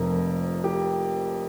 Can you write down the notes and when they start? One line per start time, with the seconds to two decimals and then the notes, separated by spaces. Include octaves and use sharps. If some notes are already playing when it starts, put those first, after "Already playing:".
Already playing: F1 F2 C3 F3 A#4
0.64 G4